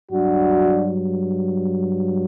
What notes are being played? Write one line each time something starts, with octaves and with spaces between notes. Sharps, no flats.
G2 F#3 D4 F#4